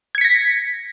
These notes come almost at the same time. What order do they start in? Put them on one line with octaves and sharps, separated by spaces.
G#6 C#7 B6 A#6